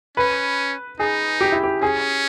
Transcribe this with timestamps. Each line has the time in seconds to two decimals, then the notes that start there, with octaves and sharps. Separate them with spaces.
0.17 C#4 B4
1.00 D#4 G#4
1.41 G4
1.52 E4
1.63 G4
1.82 C#4 G#4